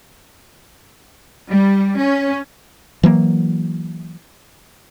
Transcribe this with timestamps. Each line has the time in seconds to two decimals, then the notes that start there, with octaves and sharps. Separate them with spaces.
1.49 G3
1.98 C#4
3.03 E3 F#3 A#3